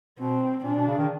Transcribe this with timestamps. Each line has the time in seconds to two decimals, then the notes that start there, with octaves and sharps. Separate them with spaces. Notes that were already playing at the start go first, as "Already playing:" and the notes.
0.19 B2 C4
0.64 A#2 D4
0.75 B2
0.87 C#3
0.98 D#3